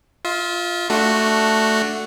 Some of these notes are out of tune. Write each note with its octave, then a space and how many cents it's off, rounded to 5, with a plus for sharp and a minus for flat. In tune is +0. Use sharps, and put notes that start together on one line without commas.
F4 +0 E5 -45
A3 +0 D4 -5 F#4 +0